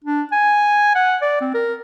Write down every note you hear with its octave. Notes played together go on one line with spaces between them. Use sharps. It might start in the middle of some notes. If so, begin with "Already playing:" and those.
D4
G#5
F#5
D5
C4
A#4